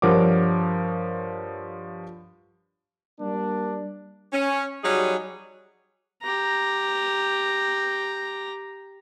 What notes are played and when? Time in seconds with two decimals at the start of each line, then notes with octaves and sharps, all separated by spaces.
0.02 G2 F3 A#4 C#5 F#5 D6
3.19 G3 A#3 D4
4.33 C#4
4.84 F#3 G3 D#4 G#4 C#5
6.23 G4 A#5